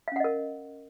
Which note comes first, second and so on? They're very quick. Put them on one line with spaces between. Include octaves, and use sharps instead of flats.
F5 C#4 F#5 D#5 A#4